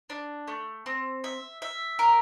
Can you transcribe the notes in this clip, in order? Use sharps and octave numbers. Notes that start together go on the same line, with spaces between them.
D4
A3
C4
E5
E5
A#4